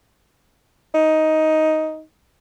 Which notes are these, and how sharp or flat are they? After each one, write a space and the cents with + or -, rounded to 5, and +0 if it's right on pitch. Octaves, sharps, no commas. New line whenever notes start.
D#4 +10